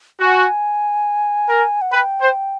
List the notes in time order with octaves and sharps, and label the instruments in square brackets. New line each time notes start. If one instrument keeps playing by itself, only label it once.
[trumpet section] F#4 [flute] G#5
[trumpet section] A#4
[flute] F#5
[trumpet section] B4 [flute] G5
[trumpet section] C5